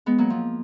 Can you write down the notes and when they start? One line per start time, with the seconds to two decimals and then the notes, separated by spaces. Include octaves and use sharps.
0.06 G#3 B3
0.18 F#3 A#3
0.30 F3